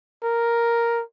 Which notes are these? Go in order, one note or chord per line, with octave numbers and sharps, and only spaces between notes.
A#4